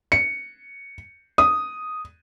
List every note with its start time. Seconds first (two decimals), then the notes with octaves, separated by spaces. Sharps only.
0.12 C#7
1.38 D#6